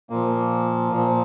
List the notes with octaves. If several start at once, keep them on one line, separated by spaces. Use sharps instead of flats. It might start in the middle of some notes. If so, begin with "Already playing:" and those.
A#2 F3 A#3
A#2 F3